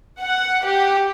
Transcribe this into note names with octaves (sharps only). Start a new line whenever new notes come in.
F#5
G4